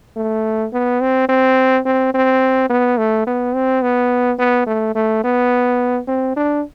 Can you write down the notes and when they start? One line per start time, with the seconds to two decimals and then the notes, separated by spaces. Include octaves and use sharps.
0.16 A3
0.73 B3
1.01 C4
1.29 C4
1.85 C4
2.14 C4
2.69 B3
2.98 A3
3.27 B3
3.55 C4
3.82 B3
4.39 B3
4.66 A3
4.95 A3
5.24 B3
6.08 C4
6.36 D4